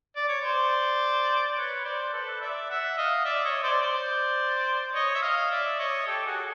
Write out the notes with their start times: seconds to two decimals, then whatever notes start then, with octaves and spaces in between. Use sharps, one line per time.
0.16 D5
0.28 C#5
0.42 C5 D5
1.57 B4 C#5
1.85 C5 D5
2.13 A4 B4
2.41 D5 E5
2.70 E5 F#5
2.98 D#5 F5
3.25 D5 E5
3.45 C#5 D#5
3.63 C5 D5
3.82 C5 D5
4.94 C#5 D#5
5.15 E5
5.22 D#5 F5
5.51 D5 E5
5.79 C#5 D#5
6.07 G4 A4
6.26 F#4 G#4
6.38 A4